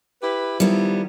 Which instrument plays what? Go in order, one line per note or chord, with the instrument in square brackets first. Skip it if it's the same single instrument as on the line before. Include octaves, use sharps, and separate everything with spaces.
[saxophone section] E4 G4 B4
[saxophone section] D#3 F3 E4 [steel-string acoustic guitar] G3 B3